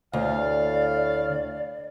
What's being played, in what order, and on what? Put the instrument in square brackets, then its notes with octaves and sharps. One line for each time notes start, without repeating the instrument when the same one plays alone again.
[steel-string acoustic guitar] D2 [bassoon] A2 [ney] D5 [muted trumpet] F5